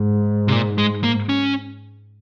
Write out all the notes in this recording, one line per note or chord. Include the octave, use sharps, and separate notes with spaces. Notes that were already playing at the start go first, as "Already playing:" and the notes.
Already playing: G#2
C3
A#2
G#3
A#3
C#4